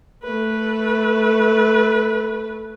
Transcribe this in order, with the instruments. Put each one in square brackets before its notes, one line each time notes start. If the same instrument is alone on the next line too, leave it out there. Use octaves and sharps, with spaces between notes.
[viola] A3 B4